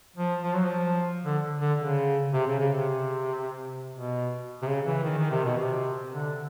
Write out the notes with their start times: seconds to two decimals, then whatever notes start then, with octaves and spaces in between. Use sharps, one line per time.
0.16 F3
0.43 F3
0.54 F#3
0.63 F3
1.24 D3
1.61 D3
1.79 C#3
2.33 C3
2.47 C#3
2.60 C#3
2.74 C3
3.95 B2
4.62 C3
4.68 C#3
4.86 E3
5.03 D#3
5.17 D#3
5.31 C3
5.44 B2
5.58 C3
6.12 D3